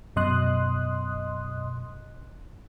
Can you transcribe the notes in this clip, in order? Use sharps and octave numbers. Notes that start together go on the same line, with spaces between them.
F#2 B2 D#5 C6 D#6 F#6